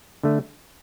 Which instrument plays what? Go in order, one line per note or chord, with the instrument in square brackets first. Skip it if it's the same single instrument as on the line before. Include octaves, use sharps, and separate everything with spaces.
[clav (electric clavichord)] D3 A3